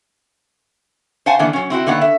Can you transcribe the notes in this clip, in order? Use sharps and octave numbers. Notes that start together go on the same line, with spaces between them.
C5 F5 F#5 G#5 A5
D3 E3 A#3 B3 F#5
F#3 C#4
C4 E4 F#4 F#5
D3 D#3 A#3 B3 F#5
E5